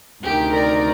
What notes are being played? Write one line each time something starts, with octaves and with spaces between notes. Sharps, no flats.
D2 C3 D#3 G4
A#4 D5